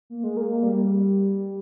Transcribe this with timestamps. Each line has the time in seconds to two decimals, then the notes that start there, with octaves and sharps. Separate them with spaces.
0.10 A#3
0.24 G#3
0.37 A#3
0.50 A#3
0.63 G3